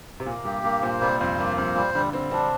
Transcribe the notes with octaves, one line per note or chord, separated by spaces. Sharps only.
C3
A#2 A#3
G2 G4
G2 A#3
A#2 C5
C3 G3
F2 C5
G2 A#3
F2 C5
A#2 G3
D3 G3
G3 C4
C4 D4